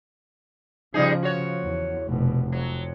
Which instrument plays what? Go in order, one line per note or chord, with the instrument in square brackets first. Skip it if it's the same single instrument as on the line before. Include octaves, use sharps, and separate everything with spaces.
[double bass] C#3 F3 [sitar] G3 D#4 G#4
[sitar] F#4 C#5
[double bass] E2
F1 B2
[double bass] F2 [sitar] F#3